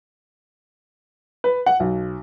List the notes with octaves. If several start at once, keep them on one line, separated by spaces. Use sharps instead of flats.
B4
F#5
B1